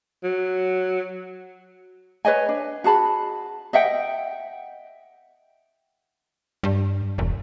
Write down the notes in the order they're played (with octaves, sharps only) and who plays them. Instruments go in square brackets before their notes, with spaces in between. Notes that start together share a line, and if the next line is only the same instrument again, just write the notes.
[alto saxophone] F#3
[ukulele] B4 C#5 D#5 G#5
D4
F#4 G#4 A5 B5
D#5 E5 F#5 G5
[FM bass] G2
E1